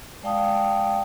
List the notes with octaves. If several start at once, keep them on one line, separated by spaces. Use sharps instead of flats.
G#3 D5 F5 G5 A5 D#6